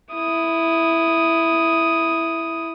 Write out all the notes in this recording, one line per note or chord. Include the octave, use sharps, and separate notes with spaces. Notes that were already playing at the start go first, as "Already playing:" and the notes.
E4 D#6